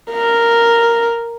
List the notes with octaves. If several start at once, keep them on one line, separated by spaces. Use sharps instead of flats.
A#4